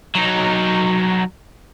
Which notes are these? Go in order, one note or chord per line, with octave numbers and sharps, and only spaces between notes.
F#3 D#4